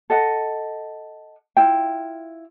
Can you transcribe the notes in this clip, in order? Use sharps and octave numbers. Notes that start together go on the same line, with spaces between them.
A4 D#5 F#5
E4 F4 G5